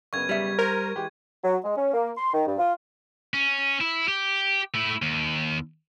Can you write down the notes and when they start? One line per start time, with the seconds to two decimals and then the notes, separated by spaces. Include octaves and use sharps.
0.13 F#1 C#3 B3 C#6 G#6
0.29 G3 E5
0.58 A#4 C5
0.95 E3 G#3 G4
1.44 F#3
1.64 G#3
1.77 C#4
1.94 A#3
2.17 C6
2.33 D#3
2.46 G2
2.59 F4
3.34 C#4
3.81 E4
4.08 G4
4.74 A3 E4
5.02 D#2